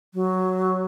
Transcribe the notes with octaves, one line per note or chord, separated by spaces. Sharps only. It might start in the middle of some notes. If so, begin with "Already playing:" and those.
F#3